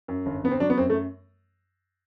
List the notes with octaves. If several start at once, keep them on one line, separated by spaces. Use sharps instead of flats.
F#2
G1
G1 B3
C4
F#3 D4
B3
F#2 C4
A3